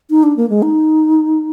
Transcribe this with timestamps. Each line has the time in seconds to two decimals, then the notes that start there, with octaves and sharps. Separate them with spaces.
0.10 D#4
0.23 D4
0.37 A#3
0.50 G#3
0.62 D#4